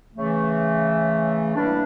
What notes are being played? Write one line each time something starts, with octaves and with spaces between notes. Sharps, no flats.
C#3 E3 A3
A2 E3 G3 A#3 D4